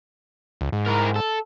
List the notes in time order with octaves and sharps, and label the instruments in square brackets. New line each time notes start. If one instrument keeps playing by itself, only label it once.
[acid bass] C#2
G#2
[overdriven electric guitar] E4 A#4
A4